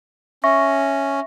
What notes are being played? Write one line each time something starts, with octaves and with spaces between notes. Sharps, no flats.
C#4 E5 C#6 A#6